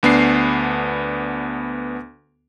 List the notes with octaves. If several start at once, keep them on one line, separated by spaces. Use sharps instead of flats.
D2 B3 D4 C7